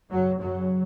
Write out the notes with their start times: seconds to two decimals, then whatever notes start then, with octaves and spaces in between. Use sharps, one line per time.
0.10 F#2 C#3 F#3
0.38 F#2 C#3 F#3